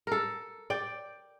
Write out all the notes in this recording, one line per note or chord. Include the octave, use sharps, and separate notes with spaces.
A4 A#4
D5 G5